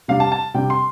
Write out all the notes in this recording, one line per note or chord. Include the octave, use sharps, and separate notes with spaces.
C3 G3 D4 F5
A5
A5
C3 G3 D4 G5
C6